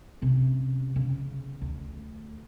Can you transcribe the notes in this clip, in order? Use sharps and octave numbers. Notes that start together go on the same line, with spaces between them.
C3 C#4
C#3
D2